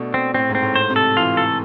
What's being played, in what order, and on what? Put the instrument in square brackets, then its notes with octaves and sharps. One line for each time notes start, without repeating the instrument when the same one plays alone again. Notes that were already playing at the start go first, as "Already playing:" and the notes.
Already playing: [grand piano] B2 A3 D4
[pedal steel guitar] C4
[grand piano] A2 [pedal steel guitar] C4
[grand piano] G#2
[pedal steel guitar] C4
[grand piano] A2
[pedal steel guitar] C5
[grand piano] C3
[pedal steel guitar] A4
[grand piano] E3 [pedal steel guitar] F4
[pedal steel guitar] A4